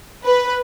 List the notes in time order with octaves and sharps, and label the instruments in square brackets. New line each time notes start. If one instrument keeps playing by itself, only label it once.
[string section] B4